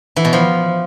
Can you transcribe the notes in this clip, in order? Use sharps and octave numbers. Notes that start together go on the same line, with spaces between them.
E3
B2
F3